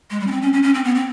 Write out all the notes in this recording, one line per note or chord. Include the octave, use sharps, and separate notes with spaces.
G#3
G3
C#4
C4
C#4
C#4
C#4
C4
B3
C4